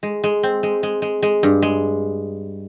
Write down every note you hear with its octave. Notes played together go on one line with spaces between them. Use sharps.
G#3
G#3
C4
G#3
G#3
G#3
G#3
G2
G#3